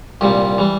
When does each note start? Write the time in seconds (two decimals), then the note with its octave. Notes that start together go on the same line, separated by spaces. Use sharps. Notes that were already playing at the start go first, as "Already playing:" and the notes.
0.21 C2 A#2 G3 G4
0.58 E3 G3